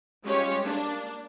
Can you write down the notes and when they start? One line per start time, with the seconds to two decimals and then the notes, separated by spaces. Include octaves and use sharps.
0.23 G3 G#3 C#4 F4 G4 C#5
0.63 A#3 D4